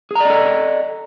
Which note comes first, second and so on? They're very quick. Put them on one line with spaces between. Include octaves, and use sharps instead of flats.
G#4 A#5 D5 D#5 A4